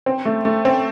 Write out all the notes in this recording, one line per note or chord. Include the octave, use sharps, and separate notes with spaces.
C4
A3
A3
C4